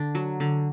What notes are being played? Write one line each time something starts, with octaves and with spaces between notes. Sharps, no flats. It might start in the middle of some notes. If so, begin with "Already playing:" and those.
Already playing: D3 D4
F#3
D3